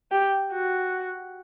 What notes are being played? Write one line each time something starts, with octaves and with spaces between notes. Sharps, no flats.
G4
F#4